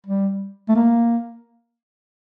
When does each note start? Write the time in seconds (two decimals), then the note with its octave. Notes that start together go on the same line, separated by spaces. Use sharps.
0.07 G3
0.69 A3
0.76 A#3